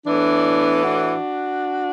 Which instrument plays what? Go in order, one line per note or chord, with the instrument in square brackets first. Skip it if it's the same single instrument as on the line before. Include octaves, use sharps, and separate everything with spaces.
[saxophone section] A2 E3 B3 D4
D4 F#4